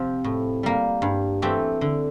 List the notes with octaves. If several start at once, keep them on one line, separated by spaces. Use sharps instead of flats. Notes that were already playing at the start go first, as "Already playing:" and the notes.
Already playing: C3 F3 C4 G4
A2
G3 A#3
G2
E3 A3 C4 G4
D3